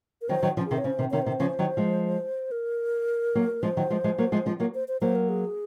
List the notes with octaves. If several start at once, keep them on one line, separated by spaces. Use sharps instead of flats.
A#4
D#3 F#3 C5
D#3 F#3
C#3 F3
C3 D#3 G#4
C#5
C#3 C5
C3 D#3
C3 D#3 C#5
C3 D#3 C5
C#3 F3
D#3 F#3
F3 G#3
A#4
F#3 A#3
F3 G#3 C5
D#3 F#3
F3 G#3
F3 G#3
F#3 A#3
F3 G#3
F3 G#3
F#3 A#3
C5
C5
F#3 A#3 C5
A#4
G#4